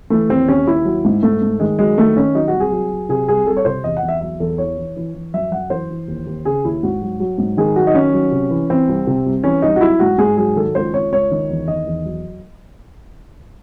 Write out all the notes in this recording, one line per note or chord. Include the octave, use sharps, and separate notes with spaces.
E3 A3
D#2 C4
D#2 C#4
D#2 E4
F#3
G#2
G#2 A3
G#2
D#3 G#3
F#3 G#3
D#3 A3
D#3 C#4
F#3 D#4
F#4
C2
G#4
F#3
F#3
C3 G#4
C2 G#4
C2 A4
C#5
C3 C5
E2 D#5
F#5
E2
E5
F#3 E5
E2 A4
E3 C#5
E3
E3
E3
F#2 E5
F#2 F#5
E3 C5
E3
D#2
D#2
C#3 G#4
D#2 E4
G#2 F#4
F#3
F#3
G#2
D#3 G#4
F#3 F#4
D#4
D#3 C#4
F#3
C3
E3
E3 C4
C2
C3
C2
E3 C#4
C2 D#4
F#4
F#3 E4
G#2 F#4
G#2 G#4
F#3 G#4
D#3 A4
C#2 C5
C#2 C#5
C#2 C#5
D#3
E2
D#3 D#5
E2
F#3